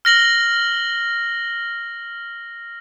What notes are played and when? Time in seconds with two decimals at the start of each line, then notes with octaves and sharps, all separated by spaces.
0.05 F6 A#6 F#7 G7